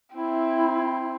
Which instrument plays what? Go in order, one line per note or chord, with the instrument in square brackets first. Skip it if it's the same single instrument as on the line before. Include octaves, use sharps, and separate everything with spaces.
[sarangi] C4 [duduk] E4